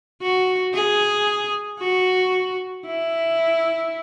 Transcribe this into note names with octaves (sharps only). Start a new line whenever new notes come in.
F#4
G#4
F#4
E4